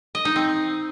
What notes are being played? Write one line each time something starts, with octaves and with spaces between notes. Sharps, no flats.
D#5
D#4
C4